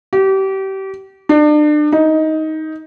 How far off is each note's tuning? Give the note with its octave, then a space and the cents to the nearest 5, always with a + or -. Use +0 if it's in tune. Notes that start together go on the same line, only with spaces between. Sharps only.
G4 -30
D4 +35
D#4 +15